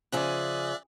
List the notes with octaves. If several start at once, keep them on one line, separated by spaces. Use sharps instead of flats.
C#3 F3 G#4 D5 E5 F#6